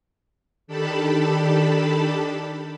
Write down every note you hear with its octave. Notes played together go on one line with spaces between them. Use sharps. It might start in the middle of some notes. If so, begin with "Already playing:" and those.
D#3 D4 G4 A4 A5 B5